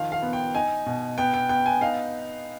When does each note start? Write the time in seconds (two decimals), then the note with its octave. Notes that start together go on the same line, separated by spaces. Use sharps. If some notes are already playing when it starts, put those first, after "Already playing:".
Already playing: D#3 F3 F5
0.12 F5
0.22 B3
0.33 G5
0.54 D#4 G#5
0.86 B2
1.18 B3 G5
1.33 G5
1.49 B3 G5
1.66 G#5
1.81 D#4 F5